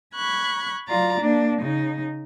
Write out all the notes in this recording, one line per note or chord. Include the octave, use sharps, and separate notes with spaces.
B5 C#6 F#6 G#6
F#3 F4 D5 A#5 A6
A#3 D4
C#3 D#4